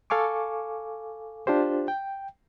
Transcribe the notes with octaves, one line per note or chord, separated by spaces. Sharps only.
A4 F5 G#5 C#6 D6
D4 F4 G4 C5
G5